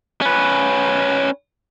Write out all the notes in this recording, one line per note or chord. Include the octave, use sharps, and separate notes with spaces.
C#4 B4